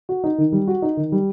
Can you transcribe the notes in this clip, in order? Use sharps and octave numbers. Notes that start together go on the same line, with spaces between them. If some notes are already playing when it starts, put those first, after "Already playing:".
F#4
D#4
D#3
G3
F#4
D#4
D#3
G3